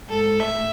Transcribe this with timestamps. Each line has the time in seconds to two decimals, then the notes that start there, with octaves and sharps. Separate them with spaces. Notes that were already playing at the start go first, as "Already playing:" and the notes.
0.09 G#2 A4
0.39 A2 E5